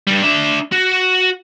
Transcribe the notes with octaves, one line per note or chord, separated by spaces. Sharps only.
G2 G3
D4 E5
F#4